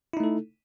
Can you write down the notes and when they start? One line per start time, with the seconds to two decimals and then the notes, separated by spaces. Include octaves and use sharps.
0.13 E4
0.17 D#4
0.20 A3
0.24 A4